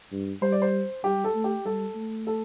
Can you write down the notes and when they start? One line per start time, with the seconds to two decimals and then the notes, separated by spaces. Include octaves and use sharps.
0.12 G2
0.42 G3 C5
0.52 D5
0.62 C5
1.04 G3 G4
1.24 A4
1.34 A3
1.44 G4
1.65 G3 A4
1.95 A3
2.27 A4